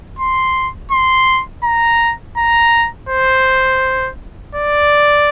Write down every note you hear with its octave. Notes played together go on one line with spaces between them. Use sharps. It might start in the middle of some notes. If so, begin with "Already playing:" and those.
C6
C6
A#5
A#5
C5
D5